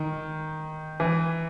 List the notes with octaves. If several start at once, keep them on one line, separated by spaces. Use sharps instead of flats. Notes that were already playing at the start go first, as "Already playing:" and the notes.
Already playing: D#3
E3